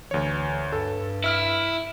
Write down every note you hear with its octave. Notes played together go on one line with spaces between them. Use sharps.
D2 E3 C#5
G2 A4
E4 E5 F6 D7